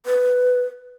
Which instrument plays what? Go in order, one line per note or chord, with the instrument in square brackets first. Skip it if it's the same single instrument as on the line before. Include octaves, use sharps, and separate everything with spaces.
[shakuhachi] B4